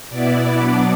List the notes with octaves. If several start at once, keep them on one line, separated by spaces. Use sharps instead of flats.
B2 B3 E4 D5
B2 F#3 B3 D4